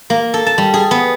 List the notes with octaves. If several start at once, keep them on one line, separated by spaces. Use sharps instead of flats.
A#3
A4
A5
G3
G#4
B3